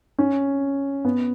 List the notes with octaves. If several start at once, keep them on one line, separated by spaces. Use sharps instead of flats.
C#4
B3